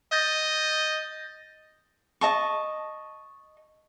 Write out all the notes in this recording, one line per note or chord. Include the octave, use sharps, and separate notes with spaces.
D#5 G6 A6 A#6
D#5 A5 C#6